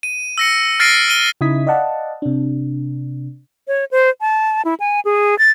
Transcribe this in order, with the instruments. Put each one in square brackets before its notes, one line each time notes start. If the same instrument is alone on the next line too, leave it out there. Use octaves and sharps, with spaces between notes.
[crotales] D#7
E6 A#6 C#7
F6 A6 A#6 C7 D7 D#7
F6 D#7 G7
[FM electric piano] C#3 D#4 E4 D#6 G#6 B6
D5 D#5 F5 F#5 A5
C3 D4
[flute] C#5
C5
A5
E4
G#5
G#4
A6